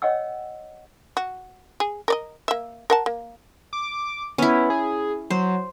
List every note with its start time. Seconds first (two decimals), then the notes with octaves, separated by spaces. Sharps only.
0.02 C#5 D#5 F#5 G5 E6
1.17 F#4
1.80 G#4
2.08 A#4 D5 D#5
2.48 A#3 E5
2.90 A#4 F#5 A5
3.06 A#3
3.73 D6
4.38 B3 C#4 E4
4.70 G#4
5.31 F#3 C5